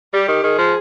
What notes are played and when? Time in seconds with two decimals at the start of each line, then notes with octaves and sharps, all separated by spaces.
0.13 G3 G4
0.28 D#3
0.44 D#3 G#4
0.59 F3